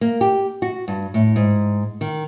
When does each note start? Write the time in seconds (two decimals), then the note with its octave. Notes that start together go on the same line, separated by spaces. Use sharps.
0.01 A#3
0.21 G4
0.62 F#4
0.88 G2
1.14 A2
1.36 G#2
2.01 D#3